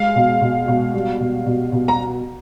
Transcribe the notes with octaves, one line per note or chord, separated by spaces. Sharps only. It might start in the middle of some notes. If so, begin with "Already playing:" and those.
Already playing: G#3 F5
B2
B2
B2
G3
B2
B2
B2
A#5